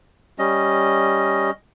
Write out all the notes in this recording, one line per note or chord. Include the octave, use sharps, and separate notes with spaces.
G3 C#4 D#5